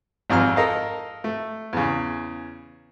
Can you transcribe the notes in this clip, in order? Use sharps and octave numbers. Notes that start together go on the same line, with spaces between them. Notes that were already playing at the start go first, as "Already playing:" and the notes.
G#1 F2 G#5 A#5 F6
A4 A#4 D#5 F5
A3
E2 C#3